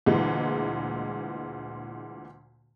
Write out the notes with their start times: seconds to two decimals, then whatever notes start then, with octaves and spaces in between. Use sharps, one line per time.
0.06 D2 A#2 E3 G#3